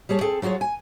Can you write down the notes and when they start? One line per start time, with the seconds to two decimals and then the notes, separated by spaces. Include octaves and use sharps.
0.09 G3 G#4 C#5 A5
0.21 C4 G#4 A4
0.42 F#3 F4 F#4 G#4 C#5
0.61 G#5